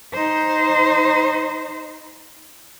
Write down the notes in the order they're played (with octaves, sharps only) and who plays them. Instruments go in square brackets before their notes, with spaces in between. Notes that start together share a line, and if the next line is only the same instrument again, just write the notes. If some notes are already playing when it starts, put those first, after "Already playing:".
[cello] D#4 C5